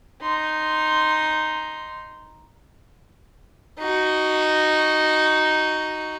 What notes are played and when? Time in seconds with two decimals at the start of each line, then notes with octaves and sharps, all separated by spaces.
0.22 D#4 C6
3.78 D#4 F#4